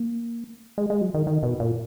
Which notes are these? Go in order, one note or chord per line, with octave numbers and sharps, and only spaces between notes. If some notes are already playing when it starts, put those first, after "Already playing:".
Already playing: A#3
G#3
G#3
F#3
D#3
D#3
B2
A#2